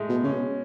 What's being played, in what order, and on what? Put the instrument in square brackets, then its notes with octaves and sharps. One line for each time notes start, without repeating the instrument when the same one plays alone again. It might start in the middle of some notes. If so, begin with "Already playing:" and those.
Already playing: [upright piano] A2 G#3
[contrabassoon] B2
[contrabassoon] C#3 [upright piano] C#4
[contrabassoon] B2